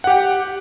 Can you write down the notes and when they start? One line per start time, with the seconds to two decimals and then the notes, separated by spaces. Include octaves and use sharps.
0.04 F#5
0.07 G4
0.10 G5